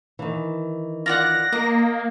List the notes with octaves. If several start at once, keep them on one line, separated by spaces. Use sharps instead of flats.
D#3 E3
F4 D5 F#5 A#6
A#3 D#5